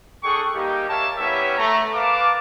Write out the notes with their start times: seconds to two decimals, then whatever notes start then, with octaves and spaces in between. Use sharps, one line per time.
0.23 D4 G#4 A4 F#5 G5 C#6
0.53 G3 A#3 D#4 G4
0.88 G4 A#4 C#5 E5 F5 A5
1.18 G3 B3 C#4 E4 C#5 E5
1.58 A3 A#5
1.94 A#4 B4 F5 A5 D6